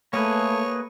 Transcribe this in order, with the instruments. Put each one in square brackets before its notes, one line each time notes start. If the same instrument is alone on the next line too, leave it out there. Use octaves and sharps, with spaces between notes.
[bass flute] A3 [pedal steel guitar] A#3 G#4 B4 [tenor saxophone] C#5